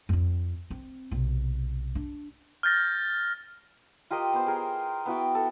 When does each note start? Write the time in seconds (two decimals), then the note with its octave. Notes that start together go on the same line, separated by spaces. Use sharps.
0.09 F2 C4
0.70 C4
1.11 B1 C3
1.95 D4
2.63 F6 G6 A6 A#6
4.11 F4 G4 A#4 D#5
4.33 B3 C5
4.46 G#4 A#4 G5
5.06 B3 E4 F#4 G5
5.35 A4